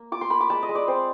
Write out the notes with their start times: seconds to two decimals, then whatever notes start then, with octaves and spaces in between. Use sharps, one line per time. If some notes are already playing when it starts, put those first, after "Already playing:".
Already playing: A#3
0.12 F4 D6
0.21 C6
0.30 A#3 B5
0.40 D6
0.50 G#3 A5
0.63 D#5
0.69 G#3
0.75 D5
0.88 C4 C5